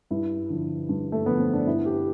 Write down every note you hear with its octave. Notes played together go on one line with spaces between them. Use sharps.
G2 E4
D3 F3
G2
A3
D3 F3 B3
C4
D4
G2 E4
G4